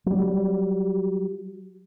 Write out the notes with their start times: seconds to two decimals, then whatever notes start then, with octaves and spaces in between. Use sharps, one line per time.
0.06 F#3 G3